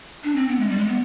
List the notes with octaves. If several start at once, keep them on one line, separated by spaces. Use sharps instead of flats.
D4
C4
B3
G#3
G3
G#3
B3